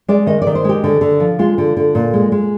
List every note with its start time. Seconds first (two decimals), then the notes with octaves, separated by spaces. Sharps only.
0.08 G#3 D5
0.26 D#3 D#5
0.42 D#3 D5
0.55 C5
0.64 G#3 G4
0.84 D3
1.01 D3
1.20 F3
1.39 G#3 F4
1.58 D3
1.77 D3
1.95 A#2
2.13 G#3
2.32 G#3